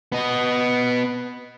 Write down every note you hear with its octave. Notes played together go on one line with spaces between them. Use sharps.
B3 D#5